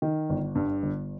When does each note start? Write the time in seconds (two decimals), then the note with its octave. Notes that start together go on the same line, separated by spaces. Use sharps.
0.02 D#3
0.30 G1
0.55 G2
0.83 G1